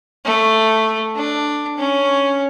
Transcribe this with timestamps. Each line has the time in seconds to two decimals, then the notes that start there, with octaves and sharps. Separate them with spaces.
0.25 A3
1.15 D4
1.78 C#4